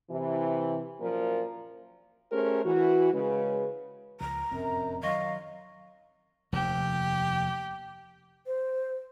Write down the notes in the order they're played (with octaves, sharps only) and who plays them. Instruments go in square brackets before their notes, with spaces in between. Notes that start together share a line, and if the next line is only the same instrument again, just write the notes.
[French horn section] C3 E3
F#2 A#2 F3 A#4
A3 C#4 G4 G#4 A#4 C5
E3 F#4
C#3 G#3 B4
[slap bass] C#2 F3 [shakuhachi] A#5
[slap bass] F1 A2 C4 [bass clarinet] F#2
[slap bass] D#3 [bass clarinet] F#3 [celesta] D#5 C#6 A#6 [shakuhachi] F5
[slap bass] F1 D#2 [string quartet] G4
[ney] C5